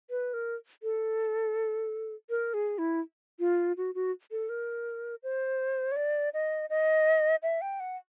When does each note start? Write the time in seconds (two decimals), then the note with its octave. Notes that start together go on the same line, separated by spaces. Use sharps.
0.10 B4
0.34 A#4
0.83 A4
2.30 A#4
2.54 G#4
2.78 E4
3.39 F4
3.77 F#4
3.95 F#4
4.32 A4
4.49 A#4
5.23 C5
5.92 C#5
5.96 D5
6.34 D#5
6.70 D#5
7.43 E5
7.61 G5
7.80 F#5